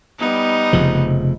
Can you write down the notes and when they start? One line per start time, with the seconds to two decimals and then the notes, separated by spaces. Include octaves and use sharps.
0.19 G3 B3 D#4
0.73 F1 C#3 F3